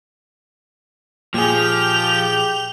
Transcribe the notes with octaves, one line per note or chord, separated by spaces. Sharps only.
A#2 F3 G4 G#4 G6 F7